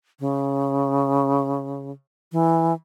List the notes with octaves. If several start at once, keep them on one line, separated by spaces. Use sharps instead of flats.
C#3
E3